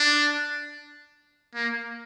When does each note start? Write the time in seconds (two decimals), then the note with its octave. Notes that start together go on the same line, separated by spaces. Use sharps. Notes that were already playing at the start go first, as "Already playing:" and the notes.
Already playing: D4
1.54 A#3